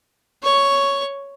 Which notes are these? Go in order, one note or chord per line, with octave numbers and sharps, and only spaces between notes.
C#5 C#6